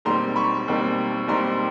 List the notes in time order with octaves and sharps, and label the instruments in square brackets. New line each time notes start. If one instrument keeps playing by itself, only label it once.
[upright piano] E1 D#2 D#3 G3 C4 A#5 C6
B5 C#6
E1 D#2 D#3 G3 C4
E1 D#2 D#3 G3 C4 A#5 C6